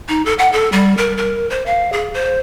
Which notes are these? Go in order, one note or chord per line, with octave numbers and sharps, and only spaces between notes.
D#4
A4
F#5
A4
G3
A#4
A#4
C5
F5
G#4
C5